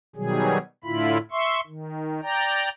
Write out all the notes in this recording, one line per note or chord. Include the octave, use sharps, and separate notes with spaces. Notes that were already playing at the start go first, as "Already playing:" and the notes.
B2 D#3 F#3 G3 G#4
A2 D3 E4 F4 B5
E5 C6 C#6
D#3
D5 G5 A#5